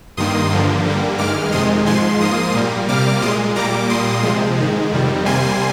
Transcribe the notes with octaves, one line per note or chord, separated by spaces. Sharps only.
G2 D#3 A#3 C6 D#6
G2 D3 F3 A#3
G2 D3 G3 A#3
G2 D#3 G#3 D6 F6
F2 C3 D#3 G#3 C6 D#6
G#2 F3 G#3 G#5 C6
G#2 F3 A#3 C6 D#6
A#2 G3 A#3
C3 G3 A#3 D6 F6
A#2 G#3 C6 D#6
A#2 G3 A#3 A#5 D6
A#2 G3 A#3 C6 D#6
C3 F3 G#3
G#2 D#3 G#3
F2 C3 D#3 G3
C3 G3 A#3 G#5 C6